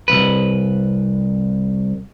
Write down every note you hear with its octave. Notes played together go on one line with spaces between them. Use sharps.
C2 G2 B4